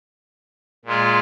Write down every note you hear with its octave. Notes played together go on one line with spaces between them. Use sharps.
A#2 G#3 F4